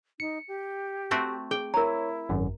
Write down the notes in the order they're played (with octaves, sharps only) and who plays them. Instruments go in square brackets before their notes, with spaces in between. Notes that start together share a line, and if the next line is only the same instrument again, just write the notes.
[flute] D#4 [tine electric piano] C#7
[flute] G4
[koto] A3 C4 F#4
[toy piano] G#4 [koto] G5
[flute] E4 [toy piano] A#4 A#5 [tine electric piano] C#5
[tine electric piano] G#1 F#2